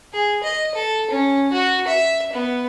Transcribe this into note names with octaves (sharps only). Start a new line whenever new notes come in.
G#4
D#5
A4
C#4
F#4
E5
B3